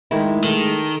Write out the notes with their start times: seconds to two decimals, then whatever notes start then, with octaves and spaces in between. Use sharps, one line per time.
0.11 D#3 G#3 A3 E4
0.44 D#3 A4